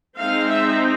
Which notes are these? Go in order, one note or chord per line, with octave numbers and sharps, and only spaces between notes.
G#3 C4 D#4 F5
E5